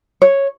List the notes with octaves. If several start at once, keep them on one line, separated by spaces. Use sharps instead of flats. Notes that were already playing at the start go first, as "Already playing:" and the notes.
C#5